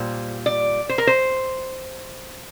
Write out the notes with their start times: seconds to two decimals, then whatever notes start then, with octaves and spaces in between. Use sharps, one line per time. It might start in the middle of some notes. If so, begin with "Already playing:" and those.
Already playing: A#2 G3 C5
0.46 D5
0.89 C5
0.98 A#4
1.07 C5